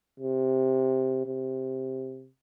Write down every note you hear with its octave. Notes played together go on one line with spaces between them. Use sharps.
C3
C3